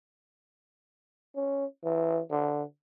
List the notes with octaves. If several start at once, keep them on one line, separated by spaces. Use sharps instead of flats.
C#4
E3
D3